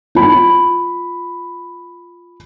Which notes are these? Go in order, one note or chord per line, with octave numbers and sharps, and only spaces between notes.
F4 B5